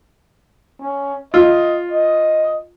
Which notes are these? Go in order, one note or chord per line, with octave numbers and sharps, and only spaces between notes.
C#4
F4 D#5
D#5